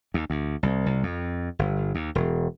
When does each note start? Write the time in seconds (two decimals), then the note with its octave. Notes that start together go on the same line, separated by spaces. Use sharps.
0.14 D#2
0.30 D2
0.63 C2
0.86 C2
1.03 F2
1.59 G1
1.95 D#2
2.15 E1